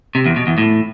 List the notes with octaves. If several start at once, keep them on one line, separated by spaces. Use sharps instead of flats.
C3
E2
B2
E2
A2